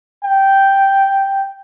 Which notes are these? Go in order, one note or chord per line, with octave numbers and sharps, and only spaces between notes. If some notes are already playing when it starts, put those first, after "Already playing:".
G5